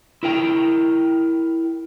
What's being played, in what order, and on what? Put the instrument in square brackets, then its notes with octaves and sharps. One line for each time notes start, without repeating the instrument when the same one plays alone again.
[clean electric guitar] E4 A#4 G5